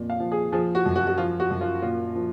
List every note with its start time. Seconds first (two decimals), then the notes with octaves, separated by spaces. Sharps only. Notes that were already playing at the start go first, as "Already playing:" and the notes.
Already playing: F2 A#2
0.10 F5
0.20 F3
0.32 G#4
0.52 F3 G#4
0.75 F#4
0.86 F#2
0.96 F#4
1.07 F#4
1.17 F3 F4
1.40 F#4
1.51 F#2
1.61 F4
1.82 A#2 F4
2.15 F3